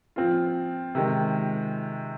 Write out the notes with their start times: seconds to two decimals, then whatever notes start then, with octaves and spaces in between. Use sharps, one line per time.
0.16 F3 C4 F4
0.95 C3 D#3 G#3